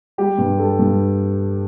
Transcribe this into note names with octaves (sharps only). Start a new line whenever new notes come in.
G3 G4
G2
G3 A4
G2